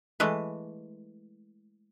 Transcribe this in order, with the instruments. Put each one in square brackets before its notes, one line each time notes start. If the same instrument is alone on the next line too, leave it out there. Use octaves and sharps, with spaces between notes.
[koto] E3 G#3 A3 B4